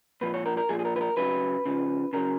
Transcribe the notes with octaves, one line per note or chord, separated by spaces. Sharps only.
A#2 F3 B4
C#5
A#4
A#4
A#2 F3 G#4
G#4
A#4
B4
A#4
C#3 F#3 B4
C#3 F3
C#3 F#3 A#4